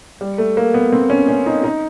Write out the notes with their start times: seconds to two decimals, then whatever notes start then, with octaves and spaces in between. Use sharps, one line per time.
0.21 G3
0.38 A3
0.57 A#3
0.74 B3
0.92 C4
1.10 C#4
1.29 C#4
1.46 D#4
1.63 D#4